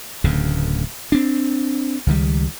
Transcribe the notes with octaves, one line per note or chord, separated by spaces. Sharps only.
D1 D2 C#3
C4 D4
C#2 D#3 G3